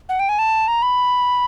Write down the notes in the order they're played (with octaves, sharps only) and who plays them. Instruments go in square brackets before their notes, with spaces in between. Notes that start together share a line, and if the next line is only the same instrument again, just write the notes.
[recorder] F#5
G5
G#5
A5
A#5
B5